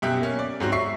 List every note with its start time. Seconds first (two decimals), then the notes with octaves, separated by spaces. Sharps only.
0.02 F#2 B2 G4 E5 F#6
0.21 A#3 C#4
0.39 D5
0.60 G#2 F#3 C4 F#4
0.72 E5 C#6 C7